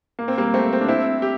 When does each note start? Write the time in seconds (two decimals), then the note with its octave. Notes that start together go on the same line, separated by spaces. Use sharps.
0.19 A#3
0.28 C4
0.38 G3 A#3
0.54 A3 C4
0.73 C4
0.81 D4
0.88 C4 E4
1.22 G4